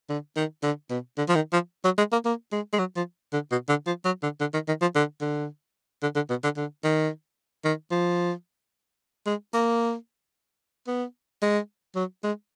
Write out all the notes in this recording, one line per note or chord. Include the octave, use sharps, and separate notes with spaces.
D3
D#3
D3
B2
D3
F3
D#3
F3
F#3
G#3
A#3
A#3
G#3
G#3
F#3
F3
D3
B2
D3
F3
F#3
D3
D3
D#3
D#3
F3
D3
D3
D3
D3
B2
D3
D3
D#3
D#3
F3
G#3
A#3
B3
G#3
F#3
G#3